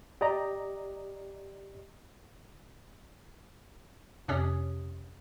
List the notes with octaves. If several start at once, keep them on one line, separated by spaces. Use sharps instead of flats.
G4 D5 D#5 A#5
F2 C3 C#4 G4 C#5 D#6